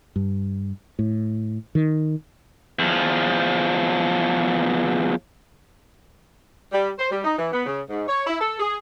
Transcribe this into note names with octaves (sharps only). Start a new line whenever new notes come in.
G2
A2
D#3
E2 F3
G3
C5
G3
D#4
E3
B3
C#3
G#2
C#5
E4
A4
G#4